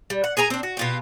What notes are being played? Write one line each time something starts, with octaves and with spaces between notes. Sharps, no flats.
G3
F#5
G#4 A#4 G#5 A#5
C4 D4
F#4
B2 F4 G4